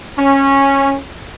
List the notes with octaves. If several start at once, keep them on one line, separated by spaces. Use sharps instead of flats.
C#4